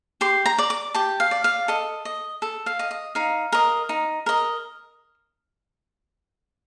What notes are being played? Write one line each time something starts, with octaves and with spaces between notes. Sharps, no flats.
G4 C6
A#5
D5
D6
G4 A5
F5
D5
F5
A4 D#5
D#5
A4
F5
D#5
D#5
D#4 F5
A#4 D#5
D#4
A#4 D#5